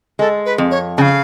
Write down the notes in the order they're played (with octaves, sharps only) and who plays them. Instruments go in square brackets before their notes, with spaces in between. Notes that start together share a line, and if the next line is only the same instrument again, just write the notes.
[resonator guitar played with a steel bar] G#3 [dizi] A4
[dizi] B4
[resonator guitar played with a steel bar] F2
[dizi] C#5
[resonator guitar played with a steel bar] C#3 [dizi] F5 A5